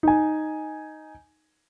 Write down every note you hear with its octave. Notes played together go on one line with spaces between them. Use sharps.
D#4 G#5